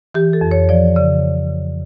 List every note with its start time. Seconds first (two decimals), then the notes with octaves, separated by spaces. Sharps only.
0.14 E3 G4
0.33 A4
0.41 F2
0.51 C#5
0.69 F3 D5
0.96 C#3 D5